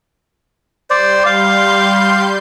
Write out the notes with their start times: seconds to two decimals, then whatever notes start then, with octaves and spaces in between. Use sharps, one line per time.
0.90 G3 C5 D5 C6 G6
1.26 F5